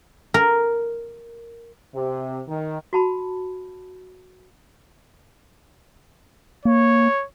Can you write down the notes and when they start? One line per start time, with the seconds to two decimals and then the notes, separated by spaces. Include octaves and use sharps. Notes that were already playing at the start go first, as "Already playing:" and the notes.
0.34 A#4
1.94 C3
2.47 D#3
2.93 F#4 A5 B5
6.65 A#3 C#5